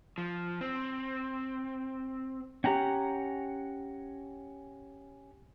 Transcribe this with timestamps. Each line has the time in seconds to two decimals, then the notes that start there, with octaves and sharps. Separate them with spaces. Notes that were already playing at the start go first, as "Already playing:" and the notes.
0.18 F3
0.61 C4
2.64 C#4 G4 F#5 G5 A#5